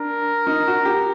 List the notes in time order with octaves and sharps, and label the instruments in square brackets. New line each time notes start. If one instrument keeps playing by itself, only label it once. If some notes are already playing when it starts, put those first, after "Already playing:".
Already playing: [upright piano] D4 [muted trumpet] A#4
[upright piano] D#4
F#4
G4